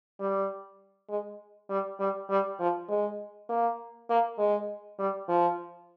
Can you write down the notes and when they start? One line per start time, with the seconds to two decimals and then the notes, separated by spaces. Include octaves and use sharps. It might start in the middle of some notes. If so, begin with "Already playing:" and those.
0.20 G3
1.09 G#3
1.70 G3
2.00 G3
2.30 G3
2.60 F3
2.89 G#3
3.49 A#3
4.10 A#3
4.38 G#3
4.99 G3
5.28 F3